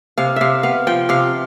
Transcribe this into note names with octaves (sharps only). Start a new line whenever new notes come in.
C3 F5
C3 E5 F5
B3 F5
F3 G5
C3 F5